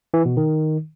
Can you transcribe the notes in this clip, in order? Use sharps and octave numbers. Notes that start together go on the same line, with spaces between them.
E3
B2
D#3